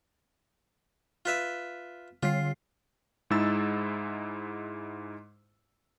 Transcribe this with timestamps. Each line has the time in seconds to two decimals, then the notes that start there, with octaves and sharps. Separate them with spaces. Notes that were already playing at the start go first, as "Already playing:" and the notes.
1.25 F4 B4 E5
2.23 D3 G3 F4 C7
3.30 G#2 G#3 D#4 E4 E6 A6